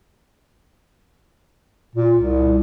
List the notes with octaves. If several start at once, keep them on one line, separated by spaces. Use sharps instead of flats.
A#2
C2